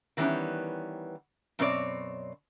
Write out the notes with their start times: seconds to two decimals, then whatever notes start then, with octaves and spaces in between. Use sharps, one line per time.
0.17 D#3 E3 G3 B3 C#4
1.59 F#2 B2 C4 C#5 D5